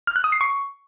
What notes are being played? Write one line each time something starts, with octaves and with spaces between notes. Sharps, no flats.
F6
F#6
D#6
C7
C#6